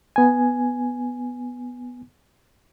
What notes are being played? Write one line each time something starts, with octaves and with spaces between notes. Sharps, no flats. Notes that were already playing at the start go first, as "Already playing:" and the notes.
B3 G#5